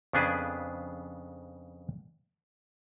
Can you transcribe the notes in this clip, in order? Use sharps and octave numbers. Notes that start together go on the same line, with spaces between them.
F2 C#3 B3 D4 G#4 B4